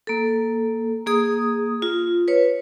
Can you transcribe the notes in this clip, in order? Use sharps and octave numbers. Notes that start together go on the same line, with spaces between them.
A#3 A4
A#3 G#4 D#6
F4
B4 C#5